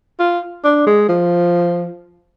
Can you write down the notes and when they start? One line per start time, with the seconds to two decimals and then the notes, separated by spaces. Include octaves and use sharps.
0.19 F4
0.64 D4
0.87 G#3
1.09 F3